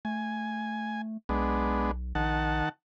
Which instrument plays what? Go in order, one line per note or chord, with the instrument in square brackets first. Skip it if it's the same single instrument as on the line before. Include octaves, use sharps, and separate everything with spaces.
[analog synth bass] A3 [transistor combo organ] G#5
[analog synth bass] B1 [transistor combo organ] G#3 B3 D4
[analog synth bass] A#1 [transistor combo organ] D#3 F#5 A5